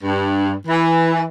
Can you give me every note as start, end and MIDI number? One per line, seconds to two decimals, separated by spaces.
0.03 0.54 43
0.67 1.23 52